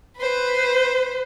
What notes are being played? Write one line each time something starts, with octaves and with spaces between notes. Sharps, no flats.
B4 C5